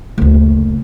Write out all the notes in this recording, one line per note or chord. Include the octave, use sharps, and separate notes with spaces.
F#1 D2